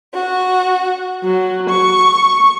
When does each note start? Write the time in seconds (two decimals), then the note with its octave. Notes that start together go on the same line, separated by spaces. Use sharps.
0.14 F#4
1.23 F#3
1.69 C#6